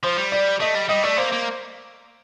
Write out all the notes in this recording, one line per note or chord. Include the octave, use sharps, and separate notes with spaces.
F3 C5
G3
D5
A3 D#5
G3
G3 D#5
A3 D5
A#3 C5
A#3